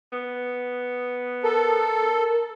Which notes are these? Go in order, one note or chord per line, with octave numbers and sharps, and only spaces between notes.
B3
A4 A#4